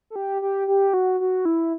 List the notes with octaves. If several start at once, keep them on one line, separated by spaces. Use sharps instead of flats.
A4
G4
G4
G4
F#4
F#4
E4